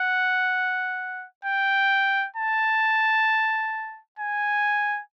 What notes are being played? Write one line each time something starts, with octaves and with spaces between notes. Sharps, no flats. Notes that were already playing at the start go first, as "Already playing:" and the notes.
Already playing: F#5
G5
A5
G#5